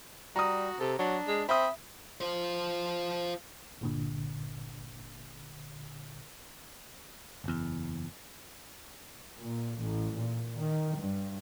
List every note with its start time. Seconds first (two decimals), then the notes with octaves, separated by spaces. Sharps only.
0.36 G3 F#4 A#5 D#6
0.80 C3 A4
0.99 F#3 D4
1.28 G#3
1.49 C4 E5 B5 D#6
2.21 F4 C5
3.81 G1 A#2 D3
7.44 F#1 E2
9.40 A#2
9.80 A1
10.14 A#2
10.58 D#3
10.95 G2